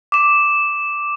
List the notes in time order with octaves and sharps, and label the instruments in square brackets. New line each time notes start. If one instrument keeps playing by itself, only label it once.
[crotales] D6 E7